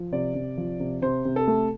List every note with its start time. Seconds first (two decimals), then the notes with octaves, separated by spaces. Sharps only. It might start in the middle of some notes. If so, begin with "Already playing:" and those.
Already playing: F3
0.12 C3 D5
0.35 C3
0.57 F3
0.80 C3
1.02 C3 C5
1.25 C3
1.36 A4
1.47 A3